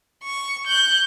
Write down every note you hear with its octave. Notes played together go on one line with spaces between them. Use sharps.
C#6
F#6 G6